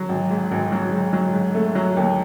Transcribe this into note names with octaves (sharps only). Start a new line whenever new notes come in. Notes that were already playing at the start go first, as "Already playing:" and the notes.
Already playing: F#3
G#1
G#2
G#1
F#3
G#2
F#3
G#2
A3
F#3
D#2